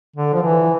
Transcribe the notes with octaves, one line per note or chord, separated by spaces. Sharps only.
D3
F3
E3